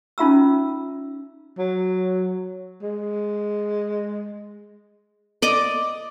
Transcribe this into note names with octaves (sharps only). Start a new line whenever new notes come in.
C#4 D#4 F4 E5 A#5 E6
F#3
G#3
D5 D#5 D6